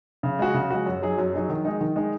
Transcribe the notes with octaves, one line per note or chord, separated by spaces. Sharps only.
C#3
G#3 F#4
C#3
G#3 F#4
F#2
F#3 D#4 G#4
F#2
F#3 D#4 G#4
D#3
G#3 D#4
D#3
G#3 D#4